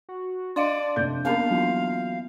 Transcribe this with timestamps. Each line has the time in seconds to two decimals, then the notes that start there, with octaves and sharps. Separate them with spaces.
0.09 F#4
0.56 D4 D5 D#5 F5 C6
0.96 F1 A3 G6
1.25 A#3 B3 C#4 A#4 F5
1.49 E3 F#3 F4